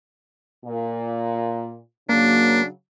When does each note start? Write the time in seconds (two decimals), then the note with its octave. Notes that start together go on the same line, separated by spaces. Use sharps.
0.64 A#2
2.09 C#3 F#3 A#3 D4